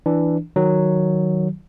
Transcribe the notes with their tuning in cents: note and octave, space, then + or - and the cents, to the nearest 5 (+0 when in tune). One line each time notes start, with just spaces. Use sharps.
E3 +0 D4 +0
D#3 +0 F#3 +0